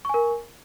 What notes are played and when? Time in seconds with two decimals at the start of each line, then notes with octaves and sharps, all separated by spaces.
0.05 C#6
0.09 G#5
0.14 A#4